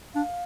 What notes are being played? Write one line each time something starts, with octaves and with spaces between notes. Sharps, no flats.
D4 F5